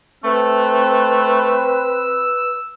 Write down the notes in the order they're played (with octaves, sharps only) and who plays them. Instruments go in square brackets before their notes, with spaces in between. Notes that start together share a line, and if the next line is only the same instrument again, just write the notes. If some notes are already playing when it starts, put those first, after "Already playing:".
[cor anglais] A3 [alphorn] C4 [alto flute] B4 [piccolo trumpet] E6